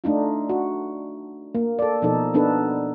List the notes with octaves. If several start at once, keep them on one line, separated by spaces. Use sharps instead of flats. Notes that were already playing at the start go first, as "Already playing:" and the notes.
A3 D4 D#4 F4
F#4
A#3
A4 D5
B2 F3 D#4 A4
B3 D4 D#4 A4 B4